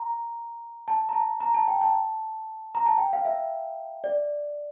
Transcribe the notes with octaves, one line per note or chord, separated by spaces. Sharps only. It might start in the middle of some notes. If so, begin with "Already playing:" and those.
Already playing: A#5
A5
A#5
A5
A#5
A5
G5
A5
A#5
A5
G5
F5
E5
D5